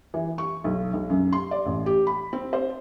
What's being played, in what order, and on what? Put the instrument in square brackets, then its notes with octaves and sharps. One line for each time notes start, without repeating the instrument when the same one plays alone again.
[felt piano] E3
C#6
B1
B1
F#2
C6
D5
A1
G4
B5
C4
C5